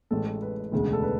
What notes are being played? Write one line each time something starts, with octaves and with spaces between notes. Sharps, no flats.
A1 A2 G#3 A4
A4
B4
E1 D2 C#3 G#3
A4
B4